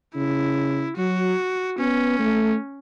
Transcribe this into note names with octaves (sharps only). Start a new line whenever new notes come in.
C#3 E4
F#3 F#4
B3 C#4
A3